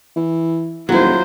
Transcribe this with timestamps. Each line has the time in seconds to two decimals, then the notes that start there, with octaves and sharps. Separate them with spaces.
0.16 E3
0.89 D#1 F#3 E4 F4 C5